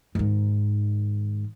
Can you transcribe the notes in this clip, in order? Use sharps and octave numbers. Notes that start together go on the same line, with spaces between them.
G#2 D#3